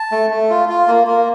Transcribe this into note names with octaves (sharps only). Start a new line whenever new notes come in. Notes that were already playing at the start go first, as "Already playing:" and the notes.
Already playing: A5
A3
A3
F4
F4
A#3
A#3